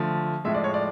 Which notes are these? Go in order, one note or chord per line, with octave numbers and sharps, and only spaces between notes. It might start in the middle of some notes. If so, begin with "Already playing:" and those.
Already playing: D3 F3 A3
A2 F3 G#3 E5
D5
C#5
D5